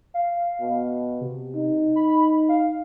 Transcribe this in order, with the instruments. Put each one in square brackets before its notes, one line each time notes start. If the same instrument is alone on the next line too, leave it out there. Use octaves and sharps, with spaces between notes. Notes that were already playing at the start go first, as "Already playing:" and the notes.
[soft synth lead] F5
[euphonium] B2
[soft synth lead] C3
[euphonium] D#4
[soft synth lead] B5
F5